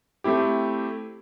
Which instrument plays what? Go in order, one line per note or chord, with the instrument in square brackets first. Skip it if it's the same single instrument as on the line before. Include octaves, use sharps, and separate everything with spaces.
[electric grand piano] A3 C4 E4 G4